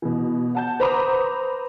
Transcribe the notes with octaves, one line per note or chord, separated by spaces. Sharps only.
B2 E3
F#5 A5 G6
B4 C5 A#5 B5 D6 D#6